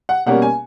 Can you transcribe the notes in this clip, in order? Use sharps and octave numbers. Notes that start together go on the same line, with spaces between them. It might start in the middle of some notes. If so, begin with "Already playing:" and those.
F#5
B2 G3 A#3 C#4 F#5
G#5